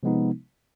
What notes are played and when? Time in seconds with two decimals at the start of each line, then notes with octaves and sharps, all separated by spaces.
0.03 C3 F3 G#3 B3 D#4